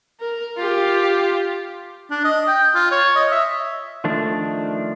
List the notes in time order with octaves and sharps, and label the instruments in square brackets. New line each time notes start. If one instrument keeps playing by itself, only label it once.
[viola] A#4
F4 G4
[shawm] D4
D#5
G5
F4
C#5
D#5
E5
[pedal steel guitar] D#3 F3 A3 D4